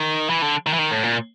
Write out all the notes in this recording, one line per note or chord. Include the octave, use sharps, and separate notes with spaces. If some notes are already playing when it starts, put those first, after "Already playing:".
Already playing: D#3
E3
D3
D#3
E3
D#3
A2
A#2